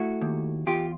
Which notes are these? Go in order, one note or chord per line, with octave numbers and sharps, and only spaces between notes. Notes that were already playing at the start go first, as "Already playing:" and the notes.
Already playing: A3 E4 F#4
D#2
E2 F4 G4